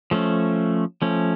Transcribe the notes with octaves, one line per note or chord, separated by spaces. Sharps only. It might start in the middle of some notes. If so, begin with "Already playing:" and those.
F3 A3 C#4
F3 A3 C#4